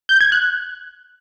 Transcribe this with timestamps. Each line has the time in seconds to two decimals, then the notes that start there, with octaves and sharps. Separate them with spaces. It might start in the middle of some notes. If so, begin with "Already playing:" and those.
0.09 G6
0.21 G#6
0.32 F#6